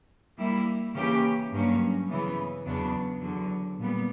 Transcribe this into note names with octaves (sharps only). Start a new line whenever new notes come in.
G3 A#3 E4
C#3 E3 A#3 C#4 G4
G2 F#3 A#3 C#4
C#3 E3 B3
E2 C#3 F#3 B3 D4
E2 D3 F#3
A#2 G3 B3